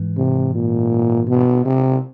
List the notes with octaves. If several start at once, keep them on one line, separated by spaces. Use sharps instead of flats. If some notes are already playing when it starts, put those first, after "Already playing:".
Already playing: G#2 E3
C3
A#2
B2
C3